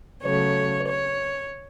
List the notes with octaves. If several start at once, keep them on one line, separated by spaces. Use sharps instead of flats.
C#3 F#3 A3 C#5
C#5